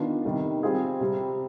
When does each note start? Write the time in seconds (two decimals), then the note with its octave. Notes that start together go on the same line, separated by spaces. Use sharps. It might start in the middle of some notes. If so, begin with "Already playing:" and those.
Already playing: D#3 B3 D4 F4
0.25 C3 D#3 G3
0.63 G3 C4 F4 G#4
1.00 C3 G3 C4